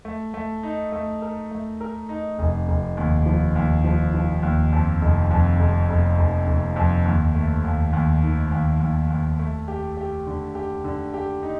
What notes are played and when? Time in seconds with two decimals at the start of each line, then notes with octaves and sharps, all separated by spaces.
0.05 A3
0.34 A3
0.63 D#4
0.92 A3
1.22 A#4
1.51 A3
1.81 A#4
2.09 D#4
2.39 F1
2.68 F1
2.97 D#2
3.26 F3
3.56 D#2
3.84 F3
4.14 F3
4.43 D#2
4.72 F2
5.01 F1
5.31 F2
5.59 F1
5.89 F1
6.18 F1
6.47 F1
6.76 F2
7.05 D#2
7.35 A3
7.64 D#2
7.93 D#2
8.23 D#3
8.51 D#2
8.80 D#2
9.10 D#2
9.39 A3
9.68 G4
9.97 G4
10.27 D3
10.55 G4
10.84 D3
11.14 G4
11.43 D#4